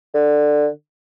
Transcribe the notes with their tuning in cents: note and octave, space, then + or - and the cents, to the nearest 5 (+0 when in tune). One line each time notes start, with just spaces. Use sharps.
D3 +15